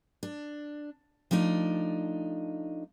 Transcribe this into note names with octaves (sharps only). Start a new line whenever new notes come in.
D4
F3 A3 D4 D#4